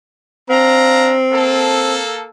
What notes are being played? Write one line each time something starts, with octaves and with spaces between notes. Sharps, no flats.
C4 D4 F5 A#5
A#3 A4